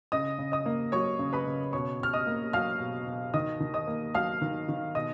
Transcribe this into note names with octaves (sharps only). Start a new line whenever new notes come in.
C#3 D#5 D#6
C#3
D#5 D#6
A#3
F#3 C#5 C#6
C#3
B4 B5
C#3
B2 C#5 C#6
B2 F6
D#5 D#6
A#3
F#3 F5 F6
B2
B2
D#3 D#5 D#6
D#3
D#5 D#6
A#3
F#3 F5 F6
D#3
D#3
B2 D#5 D#6